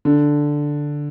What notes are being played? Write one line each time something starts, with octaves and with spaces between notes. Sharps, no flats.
D3